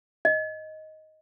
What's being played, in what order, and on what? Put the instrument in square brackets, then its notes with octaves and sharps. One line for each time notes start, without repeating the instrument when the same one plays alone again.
[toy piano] D#5